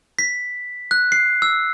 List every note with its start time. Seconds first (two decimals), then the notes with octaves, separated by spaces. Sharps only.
0.19 B6
0.91 F#6
1.12 C7
1.42 E6